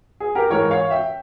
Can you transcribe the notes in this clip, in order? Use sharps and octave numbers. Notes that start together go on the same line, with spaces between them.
G#4
G4 A#4
G#2 E3 A#4 C#5
C#5 F5
E5 G5